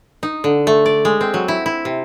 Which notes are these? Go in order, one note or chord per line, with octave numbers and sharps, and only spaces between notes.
D#4
D3
A3
D5
G#3
C4
F#3
E4
E4
C3